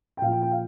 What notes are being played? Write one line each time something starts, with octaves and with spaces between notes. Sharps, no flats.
G5
A#2 F3 F5
G5
G5
F5